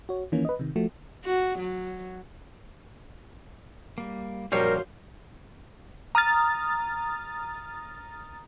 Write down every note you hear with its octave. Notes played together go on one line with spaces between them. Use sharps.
F#4 C#5
D#3 E3 A#3 C#4
B4 D#5
C3 D#3
F3 A3 F#4
F#4
F#3
G3 A#3
A#1 F#2 F#3 G3 A#4 C5 C#5 F5
A#5 D#6 F6 A6